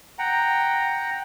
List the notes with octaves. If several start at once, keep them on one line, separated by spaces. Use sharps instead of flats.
F#5 G5 A#5